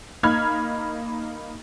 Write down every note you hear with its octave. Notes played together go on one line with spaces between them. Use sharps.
A#3 D#4 B5 F6 G#6